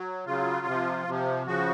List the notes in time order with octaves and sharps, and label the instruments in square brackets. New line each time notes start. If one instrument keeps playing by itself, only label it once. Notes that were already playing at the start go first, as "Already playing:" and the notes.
Already playing: [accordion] F#3
C#3 F#3 F4
C3 F3
C3 F3
C#3 F3 F#4